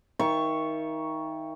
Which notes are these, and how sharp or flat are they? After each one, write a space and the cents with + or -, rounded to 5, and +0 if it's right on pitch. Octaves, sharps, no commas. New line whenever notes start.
D#3 +20 E5 +40 C#6 +0